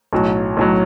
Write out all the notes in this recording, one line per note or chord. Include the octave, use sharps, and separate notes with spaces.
B1 A2 F#3
B1 A2 F#3